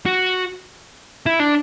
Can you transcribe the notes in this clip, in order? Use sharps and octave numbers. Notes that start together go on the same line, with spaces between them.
F#4
E4
D4